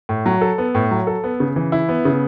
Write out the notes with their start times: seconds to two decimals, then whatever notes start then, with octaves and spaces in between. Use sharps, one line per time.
0.09 A2
0.26 F#3
0.41 A4
0.58 B3
0.75 A2
0.91 F#3
1.07 A4
1.24 B3
1.40 C#3
1.56 E3
1.72 E4
1.89 B3
2.05 C#3